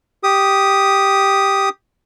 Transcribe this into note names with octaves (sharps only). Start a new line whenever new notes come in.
G4 D#6